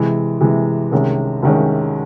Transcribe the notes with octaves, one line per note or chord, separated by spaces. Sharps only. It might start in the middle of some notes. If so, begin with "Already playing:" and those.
Already playing: C3 E3 G#3
C3 E3 G#3
C2 C3 D#3 G#3 C#4
C2 C3 D#3 G#3 C#4